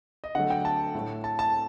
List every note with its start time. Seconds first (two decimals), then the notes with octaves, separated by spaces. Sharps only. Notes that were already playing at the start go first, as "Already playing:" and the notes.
0.24 D#5
0.35 D3 F#3 A3 F#5
0.50 G5
0.65 A5
0.94 A2 A3
1.24 A5
1.39 A5